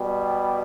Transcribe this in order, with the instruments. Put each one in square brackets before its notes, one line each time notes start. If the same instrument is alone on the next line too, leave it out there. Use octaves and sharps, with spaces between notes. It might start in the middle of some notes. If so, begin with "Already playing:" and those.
Already playing: [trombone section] B2 G3